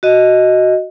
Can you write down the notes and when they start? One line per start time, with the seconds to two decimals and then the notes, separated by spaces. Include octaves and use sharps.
0.03 F#4 D#5